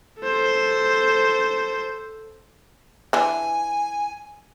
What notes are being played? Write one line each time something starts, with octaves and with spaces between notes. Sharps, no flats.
A4 C5
E3 D4 G#5